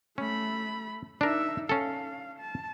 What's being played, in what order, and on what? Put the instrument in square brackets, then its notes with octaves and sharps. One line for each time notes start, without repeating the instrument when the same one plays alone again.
[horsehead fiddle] A3 B5 [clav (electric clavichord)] C#4
[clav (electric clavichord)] D4 A#4 [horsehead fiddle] D#4 E5
[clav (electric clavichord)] C#4 A4 [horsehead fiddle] F5
[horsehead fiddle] A5